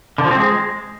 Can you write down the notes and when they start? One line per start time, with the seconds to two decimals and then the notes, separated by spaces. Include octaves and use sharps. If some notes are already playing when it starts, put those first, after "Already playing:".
0.18 D3
0.25 F3
0.31 C4
0.37 G#3